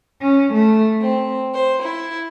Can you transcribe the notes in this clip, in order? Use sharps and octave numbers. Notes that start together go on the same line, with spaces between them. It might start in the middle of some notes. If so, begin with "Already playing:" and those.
C#4
A3
C4
C5
E4